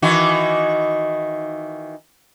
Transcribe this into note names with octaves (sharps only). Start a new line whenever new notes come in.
D#3 E3 F#4